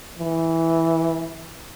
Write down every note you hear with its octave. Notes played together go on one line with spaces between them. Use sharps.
E3